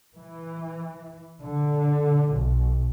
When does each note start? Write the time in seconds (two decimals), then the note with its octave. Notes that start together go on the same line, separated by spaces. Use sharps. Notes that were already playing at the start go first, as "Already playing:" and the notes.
0.16 E3
1.41 D3
2.36 B1